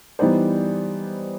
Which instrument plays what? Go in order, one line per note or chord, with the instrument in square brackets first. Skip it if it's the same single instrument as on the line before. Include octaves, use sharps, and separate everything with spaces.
[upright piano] E3 G3 B3 D#4 C5 D5